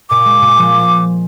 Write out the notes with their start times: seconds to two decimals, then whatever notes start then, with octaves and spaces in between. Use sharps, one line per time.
0.10 A#2 D6
0.25 G#3
0.41 A#2
0.58 F3